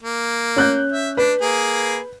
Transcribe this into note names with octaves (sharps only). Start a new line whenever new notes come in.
A#3
C#4 F#6 G6
E5
D4 B4
A#3 G#4